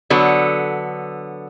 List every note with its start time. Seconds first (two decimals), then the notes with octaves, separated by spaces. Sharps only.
0.10 D3 F#3 B3 A4